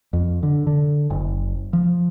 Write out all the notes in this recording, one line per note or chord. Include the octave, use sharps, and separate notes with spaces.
F2
D3
D3
F#1
F3